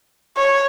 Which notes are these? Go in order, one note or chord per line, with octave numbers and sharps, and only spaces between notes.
C#5